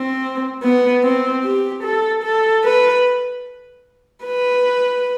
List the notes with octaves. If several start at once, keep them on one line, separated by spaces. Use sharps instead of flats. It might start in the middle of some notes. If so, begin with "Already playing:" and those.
Already playing: C4
B3
C4
G4
A4
A4
B4
B4